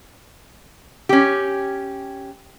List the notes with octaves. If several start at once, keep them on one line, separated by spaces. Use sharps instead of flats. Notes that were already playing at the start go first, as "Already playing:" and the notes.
C#4 G4